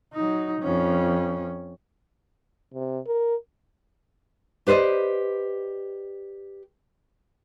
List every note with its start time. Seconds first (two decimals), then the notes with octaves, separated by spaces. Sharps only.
0.14 F#3 D#4
0.62 F2 C#4
2.74 C3
3.07 A#4
4.67 G4 B4 C5 D5 D#5